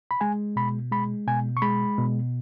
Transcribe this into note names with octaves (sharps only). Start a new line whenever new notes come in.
B5
G#3 G#5
B2 B5
G#3 B5
B2 G#5
C#6
G#3 B5
B2